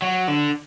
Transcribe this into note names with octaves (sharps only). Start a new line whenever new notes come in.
F#3
D3